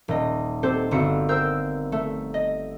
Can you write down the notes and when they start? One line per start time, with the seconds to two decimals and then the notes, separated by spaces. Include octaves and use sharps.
0.08 D#1 D#5
0.63 C4 G4 A4 C5
0.91 G1 C4 E4 F#4 C#7
1.29 A#4 C5 G5 E6 F6 G6
1.92 A3
2.34 D#5